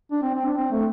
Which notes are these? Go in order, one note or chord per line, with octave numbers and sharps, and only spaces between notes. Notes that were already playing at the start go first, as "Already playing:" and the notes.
D4
C4
C4
D4
C4
A3